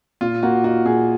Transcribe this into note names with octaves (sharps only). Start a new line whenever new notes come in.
A#2 F4
A#3 F#4
D#4 F#4
A#2 G#4